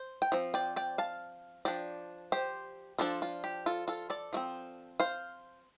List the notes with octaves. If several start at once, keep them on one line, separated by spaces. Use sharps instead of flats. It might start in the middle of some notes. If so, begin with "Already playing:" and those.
Already playing: C5
G5
F3 C4
D5 G5
D5 G5
F5 A5
F3 D4 D5 G5
G4 C5
F3 D4 F4 A4
F4
G4
F4 A4
F4 A4
A4 D5
F3 A3 C4
C5 F5